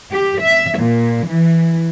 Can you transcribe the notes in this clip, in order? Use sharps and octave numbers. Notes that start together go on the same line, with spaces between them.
G4
E5
A#2
E3